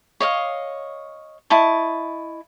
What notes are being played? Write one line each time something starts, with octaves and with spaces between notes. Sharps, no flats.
C#5 D#5 F5
E4 D#5 A5 C#6